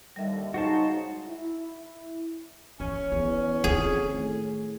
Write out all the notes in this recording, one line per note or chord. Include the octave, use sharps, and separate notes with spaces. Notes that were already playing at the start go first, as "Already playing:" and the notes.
D#2 D3 G3 E5
C#3 G#3 D#4 F#4 C5 A5
E4
E3 C#4
E2 E3
F2 D#3 F4 G#4
A2